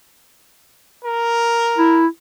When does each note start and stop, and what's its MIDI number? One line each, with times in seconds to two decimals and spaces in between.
1.05 2.03 70
1.78 2.07 64